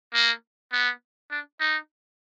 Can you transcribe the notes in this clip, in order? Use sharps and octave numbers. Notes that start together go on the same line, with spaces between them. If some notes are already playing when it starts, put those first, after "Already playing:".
A#3
B3
D4
D#4